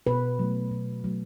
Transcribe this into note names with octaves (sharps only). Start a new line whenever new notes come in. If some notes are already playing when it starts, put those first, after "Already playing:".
B2 B4
F#3 A3
B2
F#3 A3